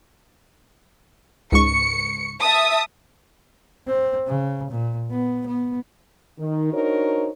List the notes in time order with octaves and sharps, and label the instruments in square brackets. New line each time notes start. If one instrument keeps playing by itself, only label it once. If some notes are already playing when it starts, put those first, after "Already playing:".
[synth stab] C#2 G#2 C#6 [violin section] C#7
[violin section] E5 A5 D#6
[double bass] C4
C#3
A#2
B3
B3
[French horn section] D#3
D4 D#4 F#4 A#4 C5 C#5